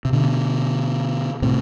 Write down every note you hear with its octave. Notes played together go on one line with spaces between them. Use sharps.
C3
B2 D3
A2 C3